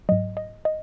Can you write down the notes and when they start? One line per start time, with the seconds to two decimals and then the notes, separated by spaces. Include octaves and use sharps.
0.09 G#2 F#3 D#5
0.37 D#5
0.65 D#5